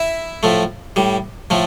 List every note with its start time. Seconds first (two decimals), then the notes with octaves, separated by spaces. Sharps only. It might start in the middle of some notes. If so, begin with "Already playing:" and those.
Already playing: E4 E5
0.43 A2 F3 A3
0.96 A2 G3
1.50 A2 F3 A3